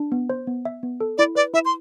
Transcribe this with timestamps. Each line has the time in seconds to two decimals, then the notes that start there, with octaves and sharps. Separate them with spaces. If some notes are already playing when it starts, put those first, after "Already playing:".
Already playing: D4
0.12 B3
0.30 C5
0.47 B3
0.65 E5
0.83 B3
1.00 A4
1.18 E4 D5
1.35 B4 D5
1.54 E4 E5
1.65 C6